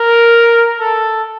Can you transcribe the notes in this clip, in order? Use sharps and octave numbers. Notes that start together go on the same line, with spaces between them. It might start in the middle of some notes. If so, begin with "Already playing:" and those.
Already playing: A#4
A4